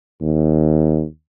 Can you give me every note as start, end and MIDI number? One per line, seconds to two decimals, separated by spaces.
0.21 1.03 39